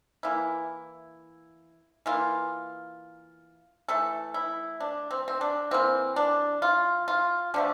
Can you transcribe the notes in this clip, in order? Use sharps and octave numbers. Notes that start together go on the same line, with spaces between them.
E3 A#3 E4
E3 A#3 F4
E3 A3 A4
E4
D4
C4
C4
D4
E3 A#3 C4
D4
F4
F4
D3 F3 A3 D4